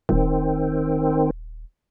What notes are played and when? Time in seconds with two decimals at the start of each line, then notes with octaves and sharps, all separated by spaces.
0.09 D#1 D#3 C4